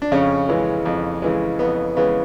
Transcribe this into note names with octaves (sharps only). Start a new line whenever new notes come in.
D4
F2 C#3 C#4
C#3 E3 G#3
F2
C#3 E3 G#3
F2 B3
C#3 E3 G#3 B3